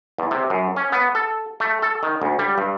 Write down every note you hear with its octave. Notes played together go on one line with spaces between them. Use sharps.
E2
C3
F#2
C#4
B3
A4
A3
A4
D#3
D2
G3
G2